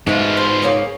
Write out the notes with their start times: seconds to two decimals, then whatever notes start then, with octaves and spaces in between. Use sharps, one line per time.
0.07 G#2 B2 G#3 A3 F4
0.37 C5
0.62 A#3 C#4 G#4